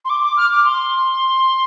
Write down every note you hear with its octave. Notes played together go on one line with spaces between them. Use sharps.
C6
D6
D6
F6
D6
C6